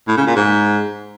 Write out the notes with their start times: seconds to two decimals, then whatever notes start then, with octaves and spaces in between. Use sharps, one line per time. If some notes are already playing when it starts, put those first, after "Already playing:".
0.08 A2
0.17 C#3
0.26 A#2
0.36 G#2